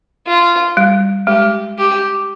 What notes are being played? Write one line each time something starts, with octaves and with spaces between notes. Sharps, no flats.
F4
G3
G#3 G4
G4